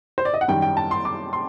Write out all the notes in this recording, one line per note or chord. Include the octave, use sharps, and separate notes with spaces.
C5
D5
D#5
F#5
F#2 D#3 G3 G5
G5
A5
C6
D6
C6